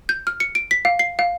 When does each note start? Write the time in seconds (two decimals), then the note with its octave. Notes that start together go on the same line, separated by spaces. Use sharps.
0.09 G6
0.27 F6
0.40 C#7
0.55 D7
0.71 B6
0.85 F5
0.99 C7
1.19 F5